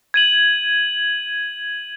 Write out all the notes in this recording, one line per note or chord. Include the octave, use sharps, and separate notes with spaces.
G#6 D#7 F#7